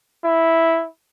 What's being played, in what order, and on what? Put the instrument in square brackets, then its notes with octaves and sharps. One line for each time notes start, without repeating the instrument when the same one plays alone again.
[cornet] E4